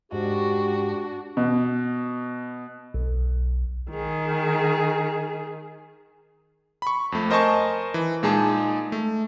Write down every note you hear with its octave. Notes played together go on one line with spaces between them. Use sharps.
G#2 D4 F#4 G4
B2
B1
D#3 G#4
B5 C#6
F2 A3
A#4 C5 D#5 G#5 A5 C#6
E3
A#2 G#3 D#4 G#4 A5
A3